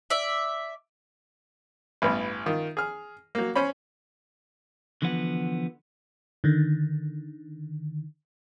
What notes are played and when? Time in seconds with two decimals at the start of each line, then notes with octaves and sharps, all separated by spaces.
0.10 D5 E5
2.02 A1 G2 B3
2.46 D#3 F4
2.77 G#4 F6
3.35 F#3 A#3
3.55 C#4 C5 C#5 B5
5.02 D3 E3 F3 B3 F5 F#5
6.44 D3 D#3